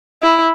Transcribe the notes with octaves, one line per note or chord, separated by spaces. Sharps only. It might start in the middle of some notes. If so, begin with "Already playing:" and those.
E4